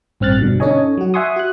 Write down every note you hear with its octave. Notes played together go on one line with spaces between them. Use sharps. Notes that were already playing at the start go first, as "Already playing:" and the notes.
A1 G2 C4 F6 F#6 A6
G2 B2 D3
C#4 D#4 A4 C#5 D#5 G#5
F#3 F#4
E5 F#5 G#5 C6 C#6 D#6
F#4 F#6